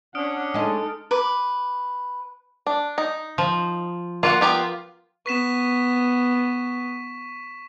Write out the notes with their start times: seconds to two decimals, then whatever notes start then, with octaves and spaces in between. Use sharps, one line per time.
0.15 C#4 D4 F#5 D#6 F6 D7
0.54 G#3 D#4 A4 D#5
1.11 B4 D6
2.66 D4
2.98 D#4
3.38 F3
4.23 A#3 F4 F#4 F#5
4.41 B3 G4 A#4
5.26 B3 C#6 B6 E7